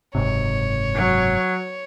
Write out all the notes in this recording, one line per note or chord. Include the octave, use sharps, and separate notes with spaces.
F#1 G#2 C3 C#5
F#3